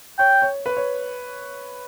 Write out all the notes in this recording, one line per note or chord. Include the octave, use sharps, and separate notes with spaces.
C#5 G5
C#5
B4
C#5